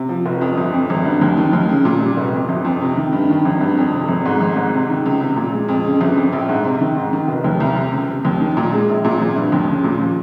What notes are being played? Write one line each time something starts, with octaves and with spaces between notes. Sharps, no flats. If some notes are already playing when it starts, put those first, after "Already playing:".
Already playing: C3
F3
F1
F2
G1
F2
G#1
G2
D#2
D#3
D#2
C#3
A#2
G3
F1
F2
G1
F2
C3
D#3
G2
D#3
G#1
G2
F2
C3
G#1
G#2
G#1
G#2
C3
D#3
C#2
C3
A#2
G#3
F2
C#3
G1
F2
A#1
G#2
C3
D#3
G#2
D#3
F1
D#2
C2
C3
C#2
C3
D#2
D#3
A#2
G#3
A#1
A#2
G#1
G2
D#2
C#3
A#2
F3